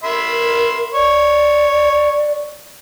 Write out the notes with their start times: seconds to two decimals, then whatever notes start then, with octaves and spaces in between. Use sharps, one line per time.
0.04 A#4 E5 B5 C6
0.94 C#5 D5